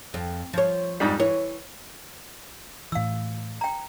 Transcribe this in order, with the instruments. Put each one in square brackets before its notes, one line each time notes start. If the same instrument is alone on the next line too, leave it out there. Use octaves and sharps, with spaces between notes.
[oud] F2
F3 C#5
[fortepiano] F2 G#2 G3
[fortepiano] E3 [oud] C#5
[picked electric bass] A2 E3 [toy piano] F5 E6
[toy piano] G5 A#5